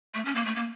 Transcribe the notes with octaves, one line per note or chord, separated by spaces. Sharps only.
A3
C#4
A#3
A3
A#3